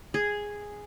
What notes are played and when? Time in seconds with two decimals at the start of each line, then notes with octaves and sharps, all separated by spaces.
0.14 G#4